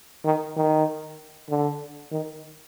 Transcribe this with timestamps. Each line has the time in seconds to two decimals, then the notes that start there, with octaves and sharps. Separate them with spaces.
0.25 D#3
0.56 D#3
1.49 D3
2.11 D#3